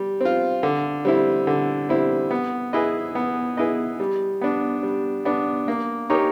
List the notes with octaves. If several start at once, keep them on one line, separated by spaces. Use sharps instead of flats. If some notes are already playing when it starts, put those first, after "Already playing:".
Already playing: G3
C4 F4
D3
G3 C4 E4
D3
G3 C4 E4
B3
E4 G#4 B4 D#5
B3
E4 G#4 B4 D#5
G3
B3 D4
G3
B3 D4
A#3
D#4 G4 A#4 C#5